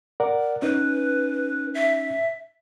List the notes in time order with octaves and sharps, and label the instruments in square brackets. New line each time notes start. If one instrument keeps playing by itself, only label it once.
[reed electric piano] A#4 D5 F#5
[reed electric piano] C#4 D#4 [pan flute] B4
[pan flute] E5